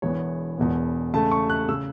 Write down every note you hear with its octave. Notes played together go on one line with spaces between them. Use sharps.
E1 E2 E3 B3 C#5
E1 E2 B2 B3
E2 C#3 A3 A5
C#6
F#6
C#3 E6